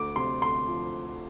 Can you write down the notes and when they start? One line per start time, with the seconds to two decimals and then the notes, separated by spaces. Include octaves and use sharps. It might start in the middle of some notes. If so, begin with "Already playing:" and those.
Already playing: D2 D6
0.16 C3 C6
0.42 D2 C6
0.68 F3